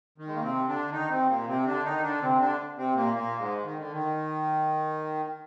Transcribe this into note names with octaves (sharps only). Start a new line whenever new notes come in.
D#3
G#3
A#3
C3 C4
D3 D4
D#3 D#4
C3 C4
A#2 A#3
C3 C4
D3 D4
D#3 D#4
D3 D4
C3 C4
D3 D4
C3 C4
A#2 A#3
A#2 A#3
G#2 G#3
D#3
D3
D#3